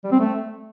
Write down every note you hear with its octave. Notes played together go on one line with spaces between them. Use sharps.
G3
C4
A3